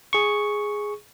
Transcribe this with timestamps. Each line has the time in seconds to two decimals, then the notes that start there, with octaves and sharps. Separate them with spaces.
0.13 G#4 C#6